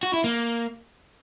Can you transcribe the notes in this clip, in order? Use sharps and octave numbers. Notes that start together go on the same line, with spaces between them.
F#4
E4
A#3